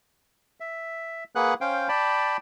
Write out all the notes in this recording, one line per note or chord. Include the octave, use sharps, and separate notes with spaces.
E5
A#3 G#4 B4 F#5 F#6
C#4 C5 F5 G5
D5 G5 A5 B5